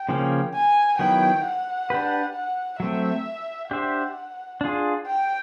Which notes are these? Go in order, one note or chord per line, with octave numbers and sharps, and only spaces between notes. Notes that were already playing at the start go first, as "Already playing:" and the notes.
Already playing: G5
C#3 F3 A#3 C#4
G#5
D#3 F#3 B3 E4 G5
F#5
D4 G4 B4
F#5
F#3 A3 C4 E5
D4 G4 C5 E5 F#5
D4 F4 G#4
G5